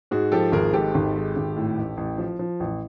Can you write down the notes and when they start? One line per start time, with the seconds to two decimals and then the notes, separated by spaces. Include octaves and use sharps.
0.11 G#2 F#4 G#4
0.32 F3 G4 A4
0.52 G#1 G#4 A#4
0.73 G#2 G4 A4
0.94 G#1
1.15 G#3
1.36 G#1
1.56 A2
1.78 A1
1.97 A1
2.18 F3
2.39 F3
2.60 A1